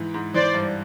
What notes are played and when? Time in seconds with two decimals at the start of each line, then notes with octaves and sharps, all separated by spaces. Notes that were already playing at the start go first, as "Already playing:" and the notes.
Already playing: G#2 E3
0.14 G#2
0.34 E3 C5 D5
0.54 G2